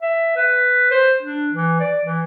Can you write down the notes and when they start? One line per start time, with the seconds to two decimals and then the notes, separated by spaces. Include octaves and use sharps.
0.02 E5
0.36 B4
0.91 C5
1.22 D4
1.53 E3
1.80 D5
2.05 E3